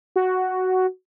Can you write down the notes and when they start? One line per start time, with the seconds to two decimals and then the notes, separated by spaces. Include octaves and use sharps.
0.16 F#4